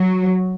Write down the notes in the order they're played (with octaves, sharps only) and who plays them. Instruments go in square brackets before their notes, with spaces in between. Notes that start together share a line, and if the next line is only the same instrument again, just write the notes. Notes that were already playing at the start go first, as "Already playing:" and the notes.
Already playing: [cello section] F#3